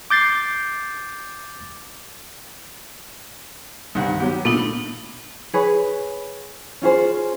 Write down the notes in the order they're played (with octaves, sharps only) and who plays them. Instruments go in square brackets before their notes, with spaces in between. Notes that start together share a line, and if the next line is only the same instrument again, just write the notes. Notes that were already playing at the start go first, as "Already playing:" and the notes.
[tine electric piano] D6 G6 A6 C7
[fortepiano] C2 G2 [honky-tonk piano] D#3 F#5
[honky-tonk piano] F#3 B3 [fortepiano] G4
[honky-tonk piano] A#2 [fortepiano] A3 [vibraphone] B3 D4 D#4
[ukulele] G#4 B4 C#5
C#4 F4 G#4 C5